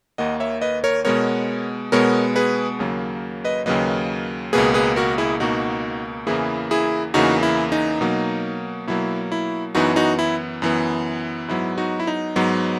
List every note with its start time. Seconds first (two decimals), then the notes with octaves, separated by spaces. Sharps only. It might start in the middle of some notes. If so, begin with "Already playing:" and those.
0.18 D#2 D#3 A#3 D#5 F#5
0.40 C#5 E5
0.62 B4 D#5
0.84 A#4 C#5
1.05 B2 G#3 B3 A#4 C#5
1.92 B2 G#3 B3 A#4 C#5
2.36 G#4 B4
2.79 D#2 C#3 F#3 A#3
3.44 B4 D#5
3.66 D#2 C#3 F#3 A#3 B4 D#5
4.53 C#2 B2 A#3 G#4 B4
4.74 G#4 B4
4.96 F#4 A#4
5.18 E4 G#4
5.40 C#2 B2 A#3 D#4 F#4
6.27 E2 C#3 E3 A#3 E4 G#4
6.71 E4 G#4
7.14 E2 C#3 E3 A#3 D#4 F#4
7.43 E4
7.72 D#4
8.01 B2 F#3 A#3
8.87 B2 F#3 A#3 E4
9.32 E4
9.75 F#2 E3 B3 D#4 F#4
9.96 D#4 F#4
10.19 E4
10.62 F#2 E3 B3
11.48 G#2 F#3 B3 E4
11.78 D#4 F#4
12.00 E4
12.07 D#4
12.36 G#2 F#3 B3